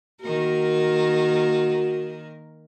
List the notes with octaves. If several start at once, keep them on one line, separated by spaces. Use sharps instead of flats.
D#3 A#3 F#4 A#4